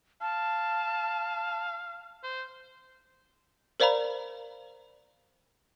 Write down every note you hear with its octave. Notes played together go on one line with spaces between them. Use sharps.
F5 A5
C5
A#4 C5 D5 F5 A#5 B5